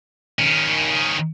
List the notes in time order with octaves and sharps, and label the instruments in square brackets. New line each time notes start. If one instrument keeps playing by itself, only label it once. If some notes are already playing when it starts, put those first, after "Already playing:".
[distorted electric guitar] D#3 C#4